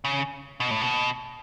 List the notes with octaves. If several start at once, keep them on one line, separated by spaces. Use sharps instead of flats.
C#3
B2
A2
B2